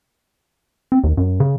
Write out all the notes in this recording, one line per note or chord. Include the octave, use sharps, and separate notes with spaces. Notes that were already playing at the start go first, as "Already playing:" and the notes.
C4
D#2
F#2
C#3